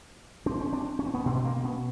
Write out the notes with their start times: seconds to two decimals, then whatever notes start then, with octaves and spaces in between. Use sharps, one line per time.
0.46 C4 D4
0.61 C#4
0.72 C4 D4
0.99 C#4
1.06 C4
1.14 B3 C#4
1.25 B2 C4 D4
1.45 A#3 C4
1.64 B3 C#4